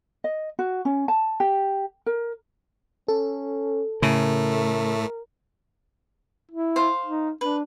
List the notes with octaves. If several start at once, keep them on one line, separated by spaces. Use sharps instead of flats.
D#5
F#4
C#4
A5
G4
A#4
C#4 A4
A2 C#3 A3 A#4
E4
C5 F5
D#4
D4 B4